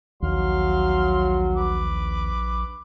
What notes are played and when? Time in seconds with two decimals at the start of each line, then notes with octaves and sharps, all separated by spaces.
0.22 A#1 D#2 F#3 F5 C6
1.56 B4 D6